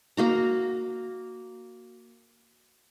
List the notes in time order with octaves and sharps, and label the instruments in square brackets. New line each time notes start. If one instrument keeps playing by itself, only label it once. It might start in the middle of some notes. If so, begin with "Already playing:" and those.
[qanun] A#3 F#4 A#5